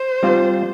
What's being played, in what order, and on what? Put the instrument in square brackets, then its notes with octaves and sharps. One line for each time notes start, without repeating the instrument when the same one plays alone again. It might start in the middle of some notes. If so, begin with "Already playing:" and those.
Already playing: [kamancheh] C5
[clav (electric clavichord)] G3 C4 F4